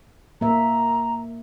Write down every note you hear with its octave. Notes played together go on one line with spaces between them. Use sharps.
A#3 E5 A#5